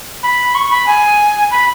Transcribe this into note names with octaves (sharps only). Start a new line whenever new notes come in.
B5
C#6
B5
G#5
B5